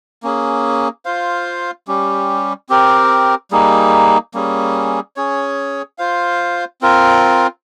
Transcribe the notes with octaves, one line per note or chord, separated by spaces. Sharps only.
A#3 C#4 G#4
F4 C5 F5
G3 C#4 G4
C4 G4 A#4
G3 A#3 D#4 G#4
G3 A#3 C#4 G#4
C#4 G#4 C#5
F4 C5 F5
C4 F4 A#4